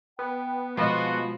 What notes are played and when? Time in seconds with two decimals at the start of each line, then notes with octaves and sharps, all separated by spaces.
0.19 B3 G5
0.77 B2 F3 G#3 B3 F4 F#4